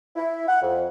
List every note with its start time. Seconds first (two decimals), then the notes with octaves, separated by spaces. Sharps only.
0.16 E4
0.48 F#5
0.62 F2